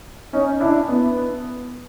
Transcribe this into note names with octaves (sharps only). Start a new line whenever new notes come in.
C#4 D#4
D4 E4
B3